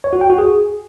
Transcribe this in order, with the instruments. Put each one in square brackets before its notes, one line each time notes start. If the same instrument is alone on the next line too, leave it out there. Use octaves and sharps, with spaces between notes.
[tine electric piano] C#5
F#4
G5
F#4
G#4